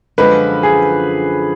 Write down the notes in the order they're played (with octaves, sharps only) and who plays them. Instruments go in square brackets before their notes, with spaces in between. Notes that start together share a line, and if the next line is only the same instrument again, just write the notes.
[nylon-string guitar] F#2 D3 F3 G#3 [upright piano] B4
[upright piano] G#4